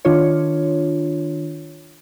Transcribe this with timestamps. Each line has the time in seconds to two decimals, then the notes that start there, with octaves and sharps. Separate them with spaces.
0.05 D#3 D4 F4 C#5